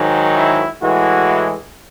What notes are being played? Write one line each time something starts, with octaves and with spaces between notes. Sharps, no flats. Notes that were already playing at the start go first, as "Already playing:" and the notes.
Already playing: G#2 D#3 F#3
E4
A2 E3 G#3 F#4